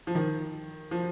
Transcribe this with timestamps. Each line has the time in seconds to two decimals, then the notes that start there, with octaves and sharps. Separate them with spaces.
0.07 F3
0.15 D#3
0.91 F3